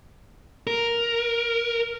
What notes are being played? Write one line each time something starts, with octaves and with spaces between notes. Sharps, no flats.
A#4